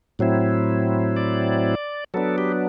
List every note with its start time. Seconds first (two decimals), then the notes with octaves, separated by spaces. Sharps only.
0.19 A2 F#3 C4 E4
1.17 D5
2.14 F#3 B3 D4 A4
2.38 G4